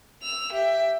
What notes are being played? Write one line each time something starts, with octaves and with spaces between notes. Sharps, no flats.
E6 F7
G4 E5